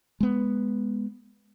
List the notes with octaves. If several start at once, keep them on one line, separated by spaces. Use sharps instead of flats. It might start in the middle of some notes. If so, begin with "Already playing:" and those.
G#3 B3